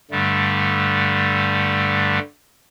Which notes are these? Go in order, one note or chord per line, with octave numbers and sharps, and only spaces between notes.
G2 D3 G3 A3